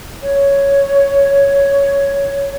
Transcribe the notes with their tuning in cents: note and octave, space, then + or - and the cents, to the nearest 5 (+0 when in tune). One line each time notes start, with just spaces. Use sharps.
C#5 +5